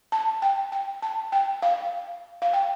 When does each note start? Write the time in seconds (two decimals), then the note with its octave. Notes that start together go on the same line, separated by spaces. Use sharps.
0.12 A5
0.42 G5
0.72 G5
1.02 A5
1.32 G5
1.62 F5
2.42 F5
2.53 G5